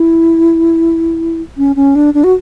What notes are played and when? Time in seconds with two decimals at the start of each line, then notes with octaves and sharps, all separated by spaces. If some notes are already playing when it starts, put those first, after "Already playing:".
Already playing: E4
1.58 C#4
1.76 C#4
1.95 D4
2.14 D4
2.24 F#4